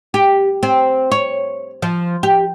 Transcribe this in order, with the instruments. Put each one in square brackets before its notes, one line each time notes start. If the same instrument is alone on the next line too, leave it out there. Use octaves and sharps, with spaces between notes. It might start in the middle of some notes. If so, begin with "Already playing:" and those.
[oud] G4
C4
C#5
F3
G4